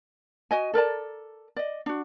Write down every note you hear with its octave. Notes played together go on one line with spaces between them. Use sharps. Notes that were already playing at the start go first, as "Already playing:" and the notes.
F#4 D#5 G#5
A4 A#4 D5 A5
D5 D#5
D4 F#4